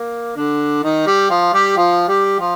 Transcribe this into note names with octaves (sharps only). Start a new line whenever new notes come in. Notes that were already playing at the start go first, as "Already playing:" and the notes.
Already playing: A#3
D3 D4
D#3 D#4
G3 G4
F3 F4
G3 G4
F3 F4
G3 G4
F3 F4